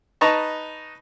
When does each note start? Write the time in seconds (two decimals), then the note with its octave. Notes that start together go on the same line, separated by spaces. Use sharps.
0.21 D#4 B4 A5 A#5 C#6